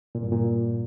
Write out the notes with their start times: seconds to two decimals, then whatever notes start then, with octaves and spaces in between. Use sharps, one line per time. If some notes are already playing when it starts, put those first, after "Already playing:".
0.15 A#2
0.23 G2
0.32 A#2